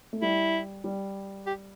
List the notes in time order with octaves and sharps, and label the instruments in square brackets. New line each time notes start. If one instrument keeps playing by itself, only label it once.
[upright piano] A3
[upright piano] G3 [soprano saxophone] E4
[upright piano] G3
[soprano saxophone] G4